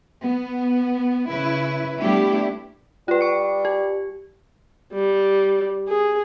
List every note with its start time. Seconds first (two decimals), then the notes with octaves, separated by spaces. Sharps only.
0.24 B3
1.29 C#3 E4 B4
2.00 G3 A3 B3 D4 E4 G4
3.08 G3 F4 B4
3.21 C#6 C#7
3.65 G4
4.93 G3
5.89 G#4